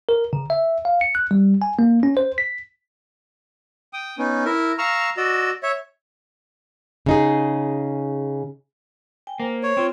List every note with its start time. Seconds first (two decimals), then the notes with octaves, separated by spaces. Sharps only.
0.09 A#4
0.33 C#3
0.50 E5
0.85 F5
1.01 C#7
1.15 F#6
1.31 G3
1.62 G#5
1.79 A#3
2.03 C#4
2.17 C5
2.38 B6
3.93 G5 D#6
4.18 B3 C#4 D#4
4.45 E4 A#4 E5
4.78 F5 A#5 C#6 E6 F6
5.17 F#4 D5 D#5 E6
5.63 C#5 E5
7.06 C#3 D#4 G#4
9.27 G5 G#5
9.40 A#3 C5
9.63 C#5
9.77 C4 F4 G5 C6